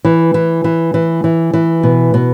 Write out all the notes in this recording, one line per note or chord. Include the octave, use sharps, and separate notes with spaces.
E3
E3
E3
E3
E3
E3
B2
B2